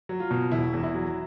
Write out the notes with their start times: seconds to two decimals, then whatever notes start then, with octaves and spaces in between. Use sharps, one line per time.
0.09 F#3
0.20 F4
0.31 B2
0.51 E1 E4
0.73 E2
0.83 E4
0.94 F#3